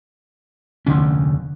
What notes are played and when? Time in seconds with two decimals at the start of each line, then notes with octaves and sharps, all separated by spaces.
0.86 F1 D2 D3 C#4